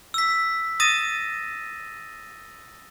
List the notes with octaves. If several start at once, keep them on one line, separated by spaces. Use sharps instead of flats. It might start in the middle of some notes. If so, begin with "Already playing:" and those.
E6 B6
D#6 A6 A#6 D#7 E7